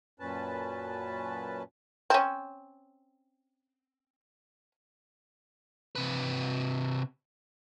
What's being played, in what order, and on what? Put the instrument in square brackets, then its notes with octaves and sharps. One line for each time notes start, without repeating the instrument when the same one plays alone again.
[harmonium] F#2 A#2 C#4 B4 A5
[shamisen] C4 C#4
[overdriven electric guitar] C3 B4